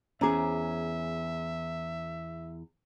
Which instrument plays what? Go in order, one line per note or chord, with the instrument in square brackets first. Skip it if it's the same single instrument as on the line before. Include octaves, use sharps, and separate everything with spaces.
[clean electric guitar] E2 [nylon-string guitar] C#4 G#4 [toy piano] C5 A#5 D6 [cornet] E5